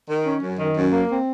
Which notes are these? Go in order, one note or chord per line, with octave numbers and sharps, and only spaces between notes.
D#3
C#4
F#2
D#3
F#2
A#3
C4